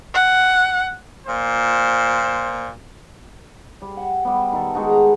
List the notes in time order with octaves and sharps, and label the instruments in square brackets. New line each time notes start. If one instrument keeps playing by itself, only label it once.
[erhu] F#5
[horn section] A#2 C5
[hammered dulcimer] G3
F#5
G3 B3
D#3 A4
G#3 D#4 F#4
A#5